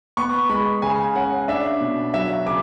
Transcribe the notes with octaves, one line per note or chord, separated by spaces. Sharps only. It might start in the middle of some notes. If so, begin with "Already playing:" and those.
B3 C#6
G#3 B5
C#3 G#5
C#4 F#5
D4 E5
B2
F#3 E5
C#3 D6